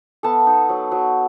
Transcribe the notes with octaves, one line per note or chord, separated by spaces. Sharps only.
B3 A4 A5
D#4
F#3
F#3